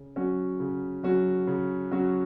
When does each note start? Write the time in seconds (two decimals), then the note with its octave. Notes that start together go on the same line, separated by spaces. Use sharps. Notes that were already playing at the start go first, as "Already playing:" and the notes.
Already playing: C#3
0.16 F#3 C#4 F#4
0.60 C#3
1.03 F#3 C#4 F#4
1.47 C#3
1.91 F#3 C#4 F#4